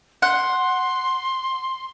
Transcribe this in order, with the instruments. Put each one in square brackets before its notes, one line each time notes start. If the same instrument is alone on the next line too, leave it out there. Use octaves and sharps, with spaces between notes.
[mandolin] F#5 [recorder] C6